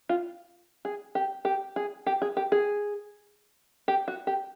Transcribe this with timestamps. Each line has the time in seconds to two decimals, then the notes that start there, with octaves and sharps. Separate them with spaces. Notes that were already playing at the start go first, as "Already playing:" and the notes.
0.09 F4
0.85 G#4
1.15 G4
1.45 G4
1.76 G#4
2.06 G4
2.22 G#4
2.37 G4
2.52 G#4
3.88 G4
4.08 F#4
4.27 G4